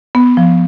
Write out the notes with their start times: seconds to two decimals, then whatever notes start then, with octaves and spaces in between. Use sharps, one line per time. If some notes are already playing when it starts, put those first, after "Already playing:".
0.15 B3
0.37 F3